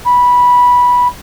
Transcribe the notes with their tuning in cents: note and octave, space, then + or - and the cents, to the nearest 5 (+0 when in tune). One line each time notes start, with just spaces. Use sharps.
B5 -10